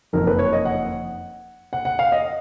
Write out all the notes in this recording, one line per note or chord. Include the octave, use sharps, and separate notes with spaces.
F#1 F2 D#3 A#4
B4
C#5
D#5
F#5
F#5
F#5
F5
D#5